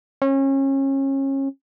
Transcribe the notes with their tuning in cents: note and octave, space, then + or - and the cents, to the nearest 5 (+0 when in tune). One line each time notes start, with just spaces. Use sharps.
C#4 -30